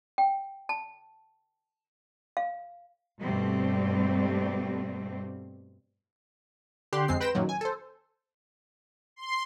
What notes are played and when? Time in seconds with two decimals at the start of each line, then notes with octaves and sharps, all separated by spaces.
0.18 G5
0.69 A5
2.37 F5
3.20 G2 B2 G3 A3 C4
6.93 D3 G4 C6 F#6
7.08 F2 G#3 C4 C7
7.20 B4 G5 C6 A#6 E7
7.35 F#2 A#2 D#3 F#3
7.49 G#5
7.61 A4 C5
9.16 C6